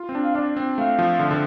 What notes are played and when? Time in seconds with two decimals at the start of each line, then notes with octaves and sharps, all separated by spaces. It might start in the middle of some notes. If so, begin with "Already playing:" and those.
Already playing: F4
0.09 C4
0.15 D4
0.24 F5
0.35 D4 D5
0.57 C4
0.78 A3 F5
0.99 F3
1.19 D3
1.31 D3